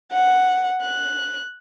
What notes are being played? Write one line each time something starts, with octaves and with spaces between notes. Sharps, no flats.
F#5
F#6